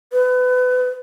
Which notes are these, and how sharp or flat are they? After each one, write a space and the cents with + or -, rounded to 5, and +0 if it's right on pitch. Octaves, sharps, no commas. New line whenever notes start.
B4 +30